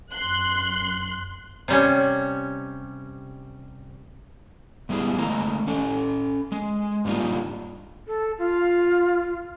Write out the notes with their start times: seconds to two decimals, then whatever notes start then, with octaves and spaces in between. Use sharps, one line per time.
0.12 F#2 C6 F#6
1.68 C3 G3 C#4
4.89 G#2 G3 B3 E4 G#4
5.18 D#3 G#3 A3 D#5 F5 A#5
5.68 C#4 A4
6.52 G#3
7.05 G#2 G3 A#3 D4 D#4 F4
8.07 A4
8.39 F4